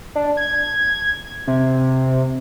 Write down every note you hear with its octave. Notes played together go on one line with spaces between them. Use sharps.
D4
G#6
C3